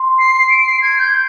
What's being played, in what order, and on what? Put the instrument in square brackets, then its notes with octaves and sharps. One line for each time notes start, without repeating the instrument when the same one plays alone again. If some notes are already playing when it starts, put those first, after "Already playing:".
Already playing: [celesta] C6
[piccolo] C7
D7
C7
G#6
G6